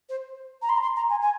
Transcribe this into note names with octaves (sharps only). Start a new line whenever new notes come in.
C5
A#5
C6
A#5
C6
A#5
G#5
G#5